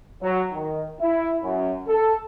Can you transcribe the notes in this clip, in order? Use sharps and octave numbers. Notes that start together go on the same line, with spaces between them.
F#3
D#3
E4
F#2
A4